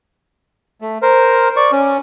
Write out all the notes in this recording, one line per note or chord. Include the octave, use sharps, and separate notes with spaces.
A3
A#4 C5
D5 C#6
C#4